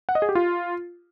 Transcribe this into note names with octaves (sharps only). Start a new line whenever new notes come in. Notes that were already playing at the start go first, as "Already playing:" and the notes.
F#5
D#5
G#4
G4
F4